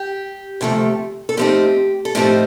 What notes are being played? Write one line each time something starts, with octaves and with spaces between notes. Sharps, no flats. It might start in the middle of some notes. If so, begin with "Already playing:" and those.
Already playing: G4
D2 C3 F3 A3
A4
A2 F3 C4 D#4 G4
A4
A2 F3 C4 D#4 G4